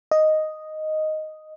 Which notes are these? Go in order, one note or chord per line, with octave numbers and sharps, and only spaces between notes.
D#5